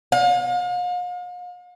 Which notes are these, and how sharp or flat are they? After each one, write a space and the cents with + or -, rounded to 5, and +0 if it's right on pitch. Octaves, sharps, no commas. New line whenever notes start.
F5 +40